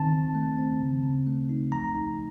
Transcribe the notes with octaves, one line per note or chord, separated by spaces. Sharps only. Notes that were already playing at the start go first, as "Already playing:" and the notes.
Already playing: D#3 C4 A5
D#3
A3
C4
C#3
C#3
A3
D#4
F3 A#5
D#4